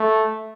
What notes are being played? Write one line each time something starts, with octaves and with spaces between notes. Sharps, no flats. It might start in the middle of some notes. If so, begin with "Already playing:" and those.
Already playing: A3